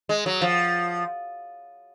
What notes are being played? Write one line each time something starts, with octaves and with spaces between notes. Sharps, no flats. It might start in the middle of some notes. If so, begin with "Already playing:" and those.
G#3
F#3
F3